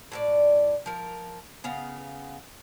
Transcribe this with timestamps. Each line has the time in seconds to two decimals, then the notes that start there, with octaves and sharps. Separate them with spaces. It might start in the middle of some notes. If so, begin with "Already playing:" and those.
0.12 A2 G4 D5
0.86 F3 A#4
1.64 C#3 B3 F5